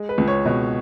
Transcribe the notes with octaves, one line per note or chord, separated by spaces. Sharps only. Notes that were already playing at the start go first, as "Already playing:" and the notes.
Already playing: G#3
B4
C#2
C#5
B2